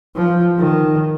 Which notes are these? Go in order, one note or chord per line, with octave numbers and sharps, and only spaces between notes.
F3
D#3